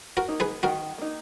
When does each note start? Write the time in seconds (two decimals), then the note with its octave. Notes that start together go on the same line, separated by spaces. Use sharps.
0.17 F#4 A#4
0.28 A#3 D#4
0.40 G#4 B4
0.63 D#3 F#4 A#4
0.98 A#3 D#4